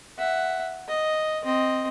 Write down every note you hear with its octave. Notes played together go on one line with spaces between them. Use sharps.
E5 F#5
D#5
C4 D#5